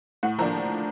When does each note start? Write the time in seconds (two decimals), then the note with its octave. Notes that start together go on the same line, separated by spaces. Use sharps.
0.23 A2 F#5
0.39 F3 A#3 D4 A#5